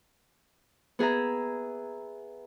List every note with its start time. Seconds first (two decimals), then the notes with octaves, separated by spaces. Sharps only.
0.99 B3 G#4 E5 A#5